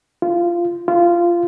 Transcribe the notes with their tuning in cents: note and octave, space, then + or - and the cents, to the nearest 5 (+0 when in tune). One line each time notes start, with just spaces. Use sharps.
F4 -15
F4 -15